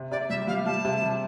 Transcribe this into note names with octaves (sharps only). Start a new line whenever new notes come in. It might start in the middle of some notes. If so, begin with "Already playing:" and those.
Already playing: C3
C3 D5
G3 E5
G3 F5
G3 A5
C3
G3